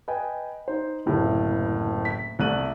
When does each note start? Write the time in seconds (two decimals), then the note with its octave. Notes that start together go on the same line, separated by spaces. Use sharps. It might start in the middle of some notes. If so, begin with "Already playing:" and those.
0.08 B4 D#5 G5 G#5
0.68 D#4 C5
1.06 F#1 D2 A2 C3
2.05 B6
2.39 C2 A3 F#6 D#7 F#7